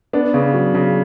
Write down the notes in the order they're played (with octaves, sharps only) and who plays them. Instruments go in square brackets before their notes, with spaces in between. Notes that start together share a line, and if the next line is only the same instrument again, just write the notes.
[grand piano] B3 [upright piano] D4
[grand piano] C#3
F#3
C#3